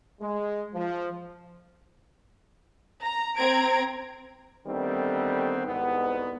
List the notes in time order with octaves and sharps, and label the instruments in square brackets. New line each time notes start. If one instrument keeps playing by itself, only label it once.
[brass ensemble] G#3
F3
[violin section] A#5
C4 A#5 G#6 D7
[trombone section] D3 D#3 G3 A3 B3 C4
C2 G#2 B3